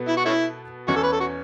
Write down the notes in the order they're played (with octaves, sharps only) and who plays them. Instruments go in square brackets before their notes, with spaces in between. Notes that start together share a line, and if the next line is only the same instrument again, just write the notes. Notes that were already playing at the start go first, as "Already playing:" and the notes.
Already playing: [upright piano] B2 B3 A4
[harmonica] E4
F#4
A3 C#4 E4
[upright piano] E2 E3 C#4 [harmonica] F#4
[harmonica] A4
B4
A4
F#4